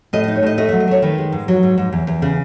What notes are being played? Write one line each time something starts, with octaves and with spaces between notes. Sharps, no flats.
A2 D#5
D#4 D#5
C#5
A2 D#5
A3 D#5
F#3 E5
D#5
A3 C#5
D#3 B4
G#3
G#2
F#3
G#2
G#2
E2
E2
C#3